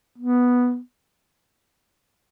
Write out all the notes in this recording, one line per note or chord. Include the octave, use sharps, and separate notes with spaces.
B3